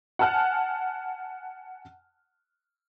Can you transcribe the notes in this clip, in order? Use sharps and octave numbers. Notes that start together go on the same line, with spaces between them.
F#5 G#5 A5 F6 F#6